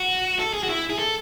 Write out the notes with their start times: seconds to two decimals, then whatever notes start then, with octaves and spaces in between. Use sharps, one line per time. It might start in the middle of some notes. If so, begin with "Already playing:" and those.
Already playing: F#4
0.39 A4
0.53 G#4
0.63 F#4
0.69 E4
0.90 G#4
0.99 A4